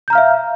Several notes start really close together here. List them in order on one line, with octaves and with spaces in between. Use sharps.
G6 A#5 F6 F5 E5